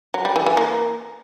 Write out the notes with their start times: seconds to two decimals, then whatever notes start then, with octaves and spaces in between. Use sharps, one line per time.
0.14 F#3
0.25 G3
0.36 E3
0.46 E3
0.57 A#3